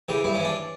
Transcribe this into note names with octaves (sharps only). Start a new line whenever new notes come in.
C#3 E3 G4
G2 E4
E3 C#4
D4